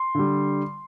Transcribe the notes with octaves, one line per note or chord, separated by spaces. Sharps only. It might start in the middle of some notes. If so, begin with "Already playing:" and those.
Already playing: C6
D3 G3